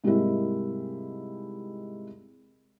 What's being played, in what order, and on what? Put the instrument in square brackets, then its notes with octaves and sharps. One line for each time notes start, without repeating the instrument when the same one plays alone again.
[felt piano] G#2 C3 G3 G#3 A#3 E4